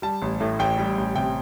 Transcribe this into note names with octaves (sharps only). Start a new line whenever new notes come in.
G3 A5
A1
A2
A1 G5
G3
A1
C3 G5